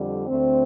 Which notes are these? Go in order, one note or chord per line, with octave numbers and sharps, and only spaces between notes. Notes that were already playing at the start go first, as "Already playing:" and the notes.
Already playing: F2 D3 G3
D2 D3 A3 C4